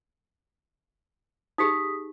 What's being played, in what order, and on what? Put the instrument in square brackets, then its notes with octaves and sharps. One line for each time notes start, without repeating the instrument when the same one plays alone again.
[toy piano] D#4 G4 G#4 [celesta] D#6 B6